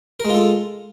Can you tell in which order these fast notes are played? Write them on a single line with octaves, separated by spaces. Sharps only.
A#4 G#3 F4 A4